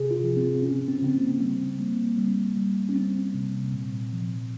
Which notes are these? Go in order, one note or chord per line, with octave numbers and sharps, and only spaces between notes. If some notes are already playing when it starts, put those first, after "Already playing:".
Already playing: C3 G#4
F4
F3
C4
C#3 C#4
C4
C#4
C#3 C4
A#3
G3 C4
G3 A#3
G3
G3
C#4
G3 C4
C3
A#2
F3